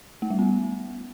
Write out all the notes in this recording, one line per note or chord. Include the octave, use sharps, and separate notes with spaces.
A3
G3
B3